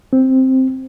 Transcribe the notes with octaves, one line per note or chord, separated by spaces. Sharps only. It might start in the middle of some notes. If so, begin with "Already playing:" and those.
C4